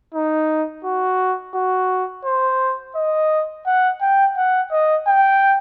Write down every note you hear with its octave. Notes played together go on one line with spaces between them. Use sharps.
D#4
F#4
F#4
C5
D#5
F#5
G5
F#5
D#5
G5